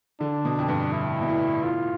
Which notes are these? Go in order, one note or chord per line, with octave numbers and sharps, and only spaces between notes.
D3 D4
B2
F2
G2
A2 E4
B2
A2
A2 F4